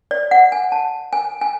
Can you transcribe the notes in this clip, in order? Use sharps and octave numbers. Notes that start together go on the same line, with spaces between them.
D5
F#5
G#5
A5
G#5
G#5